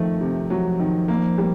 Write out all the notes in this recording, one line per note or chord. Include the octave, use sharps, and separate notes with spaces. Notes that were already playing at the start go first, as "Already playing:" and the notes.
Already playing: D#3 F3 A3
C3
F#3
D#3
A#3
G3